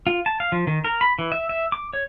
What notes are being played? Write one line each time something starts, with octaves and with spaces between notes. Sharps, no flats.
F4
A5
F5
F3
D#3
A#4
B5
E3
E5
E5
D6
C#5